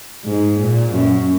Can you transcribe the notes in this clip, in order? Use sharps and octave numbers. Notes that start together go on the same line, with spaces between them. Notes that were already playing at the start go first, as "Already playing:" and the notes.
G#2
A#2
F#2